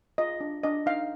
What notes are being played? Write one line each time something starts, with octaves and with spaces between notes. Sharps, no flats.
F4 D#5
D4
D4 D#5
D#4 F5